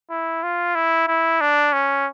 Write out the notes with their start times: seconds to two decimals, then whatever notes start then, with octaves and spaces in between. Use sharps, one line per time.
0.10 E4
0.43 F4
0.75 E4
1.07 E4
1.41 D4
1.73 C#4